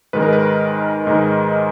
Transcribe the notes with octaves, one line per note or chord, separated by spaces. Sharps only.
G#2 D#3 G#3 B4
A#4
B4
G#2 D#3 G#3